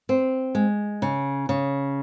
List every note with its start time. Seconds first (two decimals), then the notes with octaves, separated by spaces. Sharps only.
0.09 C4
0.55 G#3
1.02 C#3
1.49 C#3